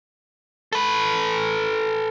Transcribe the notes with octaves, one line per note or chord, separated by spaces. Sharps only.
A4 B4